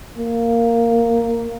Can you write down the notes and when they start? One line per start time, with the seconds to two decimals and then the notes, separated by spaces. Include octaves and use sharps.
0.18 A#3